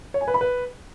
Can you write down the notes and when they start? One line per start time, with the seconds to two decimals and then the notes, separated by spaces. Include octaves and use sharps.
0.14 C#5
0.21 G#5
0.28 B4
0.34 B5
0.41 B4